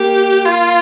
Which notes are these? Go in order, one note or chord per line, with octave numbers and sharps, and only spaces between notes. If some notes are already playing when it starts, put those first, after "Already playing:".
Already playing: A#3 G4
F4